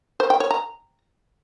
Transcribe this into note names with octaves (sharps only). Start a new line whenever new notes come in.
C5
G5
C#5
A#5